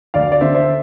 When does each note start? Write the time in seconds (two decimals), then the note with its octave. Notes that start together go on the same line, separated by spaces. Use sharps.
0.14 D2 D5 F5
0.32 D5
0.41 D3 C5 E5
0.55 C5 E5